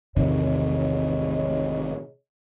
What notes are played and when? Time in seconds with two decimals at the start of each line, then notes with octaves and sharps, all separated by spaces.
0.17 A1 E2 A2 C3 D#3 G#4 C#5 D#5